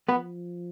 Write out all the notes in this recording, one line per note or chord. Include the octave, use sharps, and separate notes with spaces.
F3 B3 B4